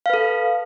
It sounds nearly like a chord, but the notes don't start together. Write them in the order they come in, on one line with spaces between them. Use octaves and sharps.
F5 B4 A4